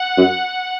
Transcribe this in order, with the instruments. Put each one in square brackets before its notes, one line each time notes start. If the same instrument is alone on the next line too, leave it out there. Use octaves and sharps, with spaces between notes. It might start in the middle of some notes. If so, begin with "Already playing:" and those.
Already playing: [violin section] F#5
[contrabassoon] F#2